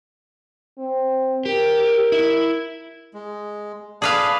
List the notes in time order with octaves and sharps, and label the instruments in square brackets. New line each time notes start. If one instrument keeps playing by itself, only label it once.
[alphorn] C4
[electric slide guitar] G4 [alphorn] A#4
[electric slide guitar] E4
[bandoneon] G#3
[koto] G#4 B4 F5 [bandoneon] D5 A5